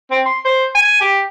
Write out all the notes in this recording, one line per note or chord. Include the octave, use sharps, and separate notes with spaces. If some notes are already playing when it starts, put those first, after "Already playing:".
C4
C6
C5
G#5
G4